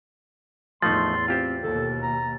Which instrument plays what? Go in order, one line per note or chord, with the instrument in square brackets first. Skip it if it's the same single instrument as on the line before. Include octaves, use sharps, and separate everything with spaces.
[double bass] E2 A2 [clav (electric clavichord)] F3 A3 D#4 [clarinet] C6 [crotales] A6
[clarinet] C4 [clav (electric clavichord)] F4 G4 C5
[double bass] D#2 B2 [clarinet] A4
[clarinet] A#5